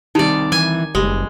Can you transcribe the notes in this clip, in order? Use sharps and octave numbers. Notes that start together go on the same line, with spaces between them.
C2 D#3 G3 D#4 D5
E3 G#5
F#1 G3 G#3